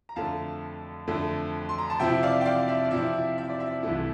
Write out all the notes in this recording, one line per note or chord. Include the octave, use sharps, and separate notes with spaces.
A#5
F2 D3 A3 F5 A5
F2 D3 A3
C6
A#5
A5
C3 F3 C4 E4 E5 G5
D5 F5
G5
D5 F5
E5
D5
C3 F3 C4 E4 E5
E5
D5
E5
C2 C3 E3 A3 E4